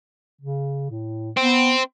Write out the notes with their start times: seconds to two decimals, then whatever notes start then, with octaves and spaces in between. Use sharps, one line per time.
0.41 C#3
0.90 A2
1.37 B3 C4